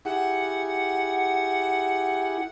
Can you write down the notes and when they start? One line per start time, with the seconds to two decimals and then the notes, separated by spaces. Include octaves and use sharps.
0.05 E4 G4 G#4 F#5